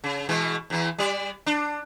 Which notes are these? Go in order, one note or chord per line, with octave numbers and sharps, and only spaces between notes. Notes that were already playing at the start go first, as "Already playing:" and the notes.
C#3
B2 E3 G#3
E2 E3
G3 D5
D4